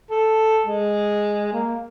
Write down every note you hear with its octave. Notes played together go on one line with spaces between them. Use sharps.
A4
G#3
A#3